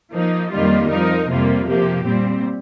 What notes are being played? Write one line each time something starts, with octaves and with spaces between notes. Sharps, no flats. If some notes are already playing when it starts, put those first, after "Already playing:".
F3 A#3 D#4
F2 D#3 G3 A#3 F4
F2 F3 D#4 A#4
F2 C3 G3 A#3 F4
C3 F3 A#3 G4
A#2 G3 C4